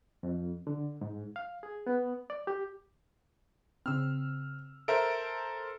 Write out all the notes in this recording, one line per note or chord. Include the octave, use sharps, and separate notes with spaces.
F2
D3
G#2
F5
G#4
B3
D5
G4
C#3 C4 E6 F6
A4 A#4 C5 E5 D7